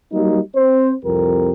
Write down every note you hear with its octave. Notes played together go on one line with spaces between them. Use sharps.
F#3 G3 A#3 D#4
C4 C5
C2 F2 G4 A#4